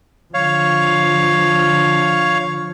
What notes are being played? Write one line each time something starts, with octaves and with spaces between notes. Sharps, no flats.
D3 F3 C#5 F5